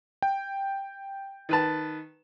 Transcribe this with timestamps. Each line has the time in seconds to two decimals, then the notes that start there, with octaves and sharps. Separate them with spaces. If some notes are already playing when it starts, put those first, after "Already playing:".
0.22 G5
1.49 D#3 B4 A5